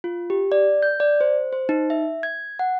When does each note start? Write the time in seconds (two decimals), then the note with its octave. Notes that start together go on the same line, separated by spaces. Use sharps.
0.04 F4
0.30 G4
0.52 D5
0.82 G6
1.00 D5
1.21 C5
1.53 C5
1.69 D#4
1.90 E5
2.23 G#6
2.59 F#5